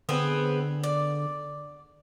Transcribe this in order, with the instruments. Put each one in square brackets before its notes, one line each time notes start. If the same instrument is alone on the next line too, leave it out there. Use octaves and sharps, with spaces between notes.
[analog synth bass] D3 [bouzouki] B3 C4 G#4
[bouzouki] D5